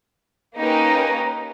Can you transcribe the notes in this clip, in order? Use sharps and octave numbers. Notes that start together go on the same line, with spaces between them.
A#3 C#4 D#4 G4 A#4 B4